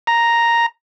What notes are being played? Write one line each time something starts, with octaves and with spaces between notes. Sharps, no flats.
A#5